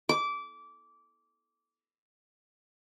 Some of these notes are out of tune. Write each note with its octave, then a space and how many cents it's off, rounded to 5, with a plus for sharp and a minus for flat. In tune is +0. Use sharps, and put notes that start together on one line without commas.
D6 -20